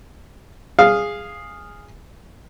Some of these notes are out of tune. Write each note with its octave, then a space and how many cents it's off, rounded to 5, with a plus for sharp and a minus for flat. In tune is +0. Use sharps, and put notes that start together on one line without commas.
G#4 -10 F5 +0